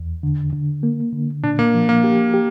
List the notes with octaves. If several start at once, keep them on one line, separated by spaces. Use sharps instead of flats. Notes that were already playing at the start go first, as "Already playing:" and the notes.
Already playing: E2
D3
D3
A#3
D3
A#2 D4
A#3
F3
A#3
G4
G4